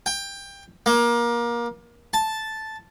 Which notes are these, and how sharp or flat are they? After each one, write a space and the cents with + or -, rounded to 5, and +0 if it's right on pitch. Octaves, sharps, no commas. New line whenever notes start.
G5 +20
A#3 +25
A5 -5